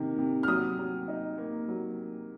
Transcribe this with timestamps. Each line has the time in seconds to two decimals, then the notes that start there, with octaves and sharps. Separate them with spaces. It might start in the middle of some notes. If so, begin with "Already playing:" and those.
Already playing: C3 D#3 A#3
0.18 C3
0.43 F6
0.47 F#3 D#6
0.78 F#3
1.08 D#4
1.38 A#3
1.68 F#3